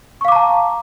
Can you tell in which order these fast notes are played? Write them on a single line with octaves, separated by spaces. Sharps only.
C#6 F5 D6 A#5 A5